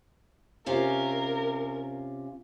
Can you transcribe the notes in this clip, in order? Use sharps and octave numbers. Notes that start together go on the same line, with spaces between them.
C3 C#4 F4 A#4